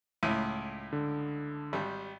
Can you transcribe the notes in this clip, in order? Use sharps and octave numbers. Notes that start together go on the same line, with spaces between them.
C#2 A2 E4 D#7
D3
G#1 G3